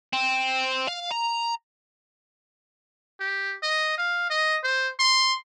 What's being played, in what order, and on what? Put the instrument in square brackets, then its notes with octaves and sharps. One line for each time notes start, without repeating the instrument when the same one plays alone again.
[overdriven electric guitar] C4
F5
A#5
[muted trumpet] G4
D#5
F5
D#5
C5
C6